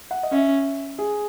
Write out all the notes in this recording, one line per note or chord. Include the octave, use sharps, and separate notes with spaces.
F#5
D#5
C#4 E5
G#4